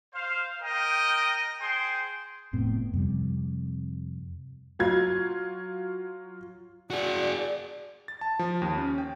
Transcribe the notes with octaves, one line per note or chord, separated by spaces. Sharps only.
C5 F5
A#4 D#5 G5
G#4 C5 G5 C6
F1 A2 B3 C4
F2 C3 G3
F#3 F4 G#6
F#4 G#4 D5
A6
A5
F3
D#2
C#4
G5